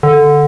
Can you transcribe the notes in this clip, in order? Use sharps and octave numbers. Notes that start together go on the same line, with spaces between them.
D3